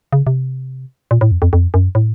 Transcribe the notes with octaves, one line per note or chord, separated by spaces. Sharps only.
C#3
C3
A#2
A2
F2
F2
F2
F#2
A2